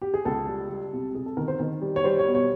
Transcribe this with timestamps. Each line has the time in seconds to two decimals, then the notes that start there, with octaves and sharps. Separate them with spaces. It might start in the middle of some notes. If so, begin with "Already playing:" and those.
0.02 G4
0.14 G#4
0.25 C#2 A4
0.48 G3
0.70 G3
0.93 C3
1.15 C3 G#4
1.26 A4
1.37 D#3 A#4
1.48 C5
1.60 D#3
1.82 G3
1.96 C#5
2.04 G3 C5
2.19 C#5
2.27 B2
2.35 C#5